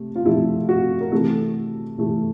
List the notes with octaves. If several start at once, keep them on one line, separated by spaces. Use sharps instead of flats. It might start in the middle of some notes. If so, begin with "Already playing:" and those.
Already playing: C3 A3
F4
C3 F3 A3 E4
F#4
A#4
C3 E3 A3 A4
C3 E3 A3